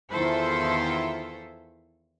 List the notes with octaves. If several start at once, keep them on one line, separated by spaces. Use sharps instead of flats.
E2 D#3 E4 F4 A4 C5